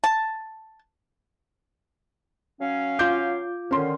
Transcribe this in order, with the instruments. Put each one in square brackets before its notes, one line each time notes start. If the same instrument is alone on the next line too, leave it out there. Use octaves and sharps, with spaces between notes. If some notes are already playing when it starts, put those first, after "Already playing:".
[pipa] A5
[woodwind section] F#3 C#4 F5
[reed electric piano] F4 D6 [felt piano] G6
[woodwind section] D3 D#3 [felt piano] C#4 C6